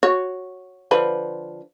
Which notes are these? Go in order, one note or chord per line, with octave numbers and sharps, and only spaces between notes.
F#4 C#5
D3 F3 B4